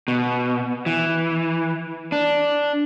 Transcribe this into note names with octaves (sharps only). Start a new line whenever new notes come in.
B2
E3
D4